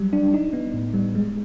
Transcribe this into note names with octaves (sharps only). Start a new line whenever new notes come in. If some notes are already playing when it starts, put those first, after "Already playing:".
Already playing: F#3 G3
D4
D#4
B3
A2
G3
G#3